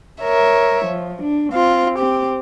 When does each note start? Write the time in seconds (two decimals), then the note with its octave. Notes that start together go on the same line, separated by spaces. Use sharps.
0.22 A#4 C#5 E5
0.85 F3
1.23 D4
1.53 C4 F4
1.98 C4 G4